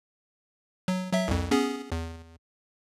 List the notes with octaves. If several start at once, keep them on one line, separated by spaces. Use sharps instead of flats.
F#3
F#3 E5
C2 F2
B3 C#4 G#4
E2